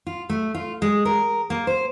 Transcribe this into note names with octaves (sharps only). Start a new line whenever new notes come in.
F4
A3
F4
G#3
A#4
A#3
C5